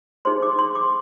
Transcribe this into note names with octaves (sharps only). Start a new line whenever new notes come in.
D#4 G#4 C5 C6
D6
C6
D6